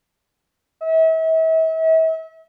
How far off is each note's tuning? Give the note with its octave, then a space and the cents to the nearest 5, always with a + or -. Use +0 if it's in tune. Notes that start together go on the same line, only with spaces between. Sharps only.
E5 -40